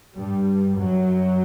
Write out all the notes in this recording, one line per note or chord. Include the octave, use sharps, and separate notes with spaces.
G2 G3
F#2 F#3